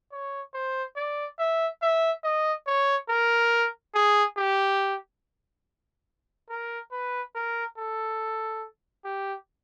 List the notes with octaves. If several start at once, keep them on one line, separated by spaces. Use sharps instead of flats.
C#5
C5
D5
E5
E5
D#5
C#5
A#4
G#4
G4
A#4
B4
A#4
A4
G4